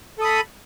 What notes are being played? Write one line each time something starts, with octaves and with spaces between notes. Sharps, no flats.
A4 B5 D#6